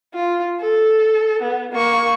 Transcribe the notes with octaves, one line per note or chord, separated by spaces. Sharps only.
F4
A4
B3
A#3 C#6